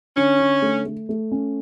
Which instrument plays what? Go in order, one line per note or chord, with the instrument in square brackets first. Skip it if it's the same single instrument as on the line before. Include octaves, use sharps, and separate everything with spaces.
[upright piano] D3 [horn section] C#4
[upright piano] D3
A3
A3
A3
C#4